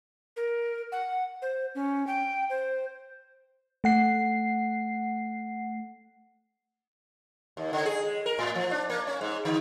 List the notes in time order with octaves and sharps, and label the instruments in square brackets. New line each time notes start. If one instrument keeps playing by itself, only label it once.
[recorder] A#4
F#5
C5
C#4
G5
C5
[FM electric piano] A3 F#5 C7
[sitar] D#2
D3
G#4
G#3
A#4
A2
F3
D4
A#3
C#4
G#2
D3